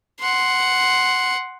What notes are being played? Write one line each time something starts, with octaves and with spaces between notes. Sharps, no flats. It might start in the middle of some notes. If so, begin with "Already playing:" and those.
F#5 C6